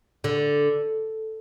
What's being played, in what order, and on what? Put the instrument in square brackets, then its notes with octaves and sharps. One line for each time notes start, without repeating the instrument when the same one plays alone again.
[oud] D3